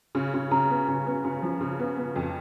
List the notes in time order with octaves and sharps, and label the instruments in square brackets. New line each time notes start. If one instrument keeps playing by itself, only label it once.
[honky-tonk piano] C#3
C#3
[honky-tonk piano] C#3 [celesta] A#5
[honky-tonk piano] B3
C#3
B3
C#3
F3
C#3
B3
B3
F2